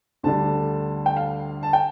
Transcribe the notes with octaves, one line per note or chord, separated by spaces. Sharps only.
D2 D3 G3 A5
G5
F5
A5
G5